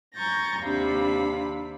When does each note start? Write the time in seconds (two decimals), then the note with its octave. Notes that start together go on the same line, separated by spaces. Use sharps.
0.16 G#5 A#5 C#6 G6 A6 A#6
0.61 D#2 C3 D4 F5 B5